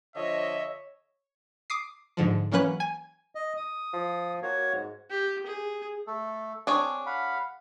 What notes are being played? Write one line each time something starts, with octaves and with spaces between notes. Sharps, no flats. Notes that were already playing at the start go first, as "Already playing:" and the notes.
D3 F3 C#5 D#5 E5
D6 D#6 C7
G#2 D3 F3
E3 F#3 A#3 C#4 B4 F#6
G#5
D#5
D#6
F3
A#3 F#4 C#5
G#2
G4
G#4
A3 A4
C4 D4 G#4 C#5
F5 F#5 B5